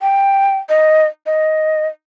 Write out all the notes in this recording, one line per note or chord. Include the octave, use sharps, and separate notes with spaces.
G5
D#5
D#5